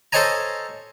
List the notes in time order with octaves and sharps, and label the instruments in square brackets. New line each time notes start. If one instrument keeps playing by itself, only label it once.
[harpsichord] A4 C5 C#5 D#5 G#5 A#5